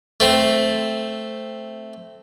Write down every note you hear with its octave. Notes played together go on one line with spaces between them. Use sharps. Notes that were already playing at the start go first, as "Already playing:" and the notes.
A3 C4